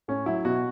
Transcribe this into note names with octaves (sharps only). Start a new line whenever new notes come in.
A2 C#4
F#3 E4
B2 F#4